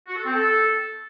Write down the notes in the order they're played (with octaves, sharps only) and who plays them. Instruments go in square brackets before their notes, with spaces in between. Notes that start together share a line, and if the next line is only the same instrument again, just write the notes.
[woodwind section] F#4
A4
C4
A4